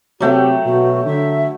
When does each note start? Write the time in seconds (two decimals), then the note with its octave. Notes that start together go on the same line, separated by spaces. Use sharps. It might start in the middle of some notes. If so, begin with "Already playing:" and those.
0.20 C3 F#3 A3 G4 G5
0.65 B2 F#4
1.06 D3 E5